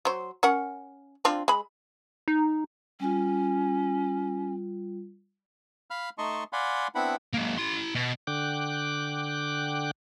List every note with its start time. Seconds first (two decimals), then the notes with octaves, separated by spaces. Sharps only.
0.05 F#3 C5
0.43 C#4 A#4 F#5
1.25 C4 D4 F4
1.48 G#3 B5
2.28 D#4
3.00 G3 C#4 F4
5.90 F5 B5 F6
6.18 A3 D#4 D#5 A5 C6 C#6
6.53 D5 F5 F#5 G#5 B5 C6
6.95 B3 C4 D4 E4 F#5 B5
7.34 G#3 A#3
7.58 E4 C6
7.95 B2
8.27 D3 G5 D6 F#6